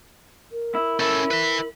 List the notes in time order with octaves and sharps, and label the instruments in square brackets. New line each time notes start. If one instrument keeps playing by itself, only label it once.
[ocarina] A#4
[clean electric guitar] E4
[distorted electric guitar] C#4 A4 [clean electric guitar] E4
[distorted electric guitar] B4 E5